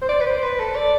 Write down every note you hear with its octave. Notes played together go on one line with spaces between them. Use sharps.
C5
D5
B4
C5
B4
A4
D5